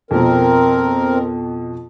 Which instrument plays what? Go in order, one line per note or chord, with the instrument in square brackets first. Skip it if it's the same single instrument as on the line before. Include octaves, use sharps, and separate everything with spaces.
[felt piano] F2 B2 [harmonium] C4 A#4